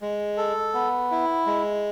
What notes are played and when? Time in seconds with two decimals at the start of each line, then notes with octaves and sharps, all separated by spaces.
0.02 G#3
0.37 A4
0.74 B3
1.11 E4
1.47 G#3